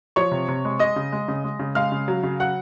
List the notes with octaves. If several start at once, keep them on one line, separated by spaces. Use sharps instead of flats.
F3 C#5 C#6
C3
C3
G#3
G#3 D#5 D#6
C#3
G#3
C#3
G#3
C#3
G#3 F5 F6
C#3
F#3
C#3
F#3 F#5 F#6